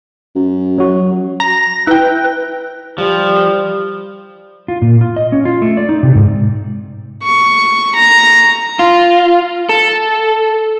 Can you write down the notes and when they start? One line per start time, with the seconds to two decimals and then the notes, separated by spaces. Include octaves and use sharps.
0.36 F#2
0.78 F#3 F#4
1.40 A#5 A#6
1.87 E4 B4 G5
2.98 F3 G3
4.68 F4
4.82 A#2
5.01 F4
5.16 D#5
5.32 C#4
5.45 F4
5.62 A3
5.77 D5
5.89 D#4
6.03 C3
6.15 G#2
7.23 C#6
7.95 A#5
8.79 F4
9.69 A4